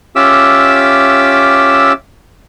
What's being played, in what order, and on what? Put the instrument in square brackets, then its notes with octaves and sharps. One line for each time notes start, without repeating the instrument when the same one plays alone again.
[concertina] C#4 F4 G4 E5 D6 E6